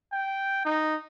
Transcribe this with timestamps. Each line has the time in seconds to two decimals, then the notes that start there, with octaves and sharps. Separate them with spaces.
0.13 G5
0.65 D#4